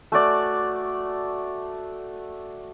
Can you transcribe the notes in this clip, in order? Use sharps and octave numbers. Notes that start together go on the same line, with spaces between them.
A3 F#4 D5